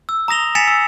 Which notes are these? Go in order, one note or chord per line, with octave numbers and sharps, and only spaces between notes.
E6
A#5 D#6 A#6 F7 G7
G#5 A6 B6 C#7 E7 F7
E6